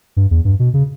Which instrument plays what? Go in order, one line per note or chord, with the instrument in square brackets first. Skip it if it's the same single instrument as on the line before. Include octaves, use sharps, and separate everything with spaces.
[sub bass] G2
E2
G2
B2
C#3